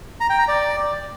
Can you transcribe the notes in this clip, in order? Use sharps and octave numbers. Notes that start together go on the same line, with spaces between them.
A#5
G5
A#5
D5